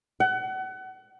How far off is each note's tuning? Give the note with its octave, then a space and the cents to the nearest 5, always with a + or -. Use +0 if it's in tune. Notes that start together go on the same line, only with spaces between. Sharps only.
F#5 +30